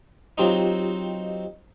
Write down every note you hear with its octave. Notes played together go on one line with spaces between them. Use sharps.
F#3 C4 D#4 F4 G4 D#5